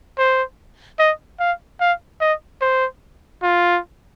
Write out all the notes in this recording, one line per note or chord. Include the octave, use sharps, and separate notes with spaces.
C5
D#5
F5
F5
D#5
C5
F4